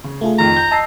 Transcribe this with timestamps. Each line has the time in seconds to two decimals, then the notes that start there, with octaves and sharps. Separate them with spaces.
0.04 C#3
0.21 A3 F4 G#4
0.38 F2 D#3 A#5
0.57 G6 A#6
0.71 D#5 A5 E6 C7